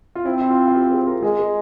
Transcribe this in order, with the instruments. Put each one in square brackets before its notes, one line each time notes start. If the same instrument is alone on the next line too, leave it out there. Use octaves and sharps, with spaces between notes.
[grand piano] F4
[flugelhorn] C4 [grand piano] E4
[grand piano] E4
F4
F4
G4
G#4
A#4
[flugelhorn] G#3 [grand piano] G#4
[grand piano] G#4